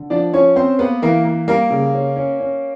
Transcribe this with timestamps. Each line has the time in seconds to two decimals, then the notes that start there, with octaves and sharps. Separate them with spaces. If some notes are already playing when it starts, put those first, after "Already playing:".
Already playing: D3
0.10 F3 D4 D5
0.33 F3 C#4 C#5
0.56 C4 C#4 C5
0.79 A#3 B3 B4
1.02 E3 A#3 A#4
1.25 A#3
1.48 G3 A#3 A#4
1.70 C#3
1.94 C#4
2.16 C#4
2.40 C#4